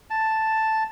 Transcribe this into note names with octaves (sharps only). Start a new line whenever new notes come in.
A5